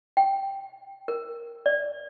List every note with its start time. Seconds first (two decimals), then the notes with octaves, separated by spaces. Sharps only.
0.17 G5
1.08 A#4
1.66 D5